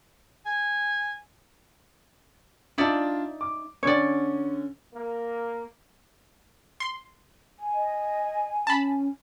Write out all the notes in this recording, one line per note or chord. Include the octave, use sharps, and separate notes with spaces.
G#5
D4 D#4 F4 D5 E5 A5
D6
D3 C#4 C#5 D5
A#3
C6
G#5
D#5
C#4 A5 B5